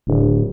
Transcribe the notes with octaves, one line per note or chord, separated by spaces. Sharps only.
D1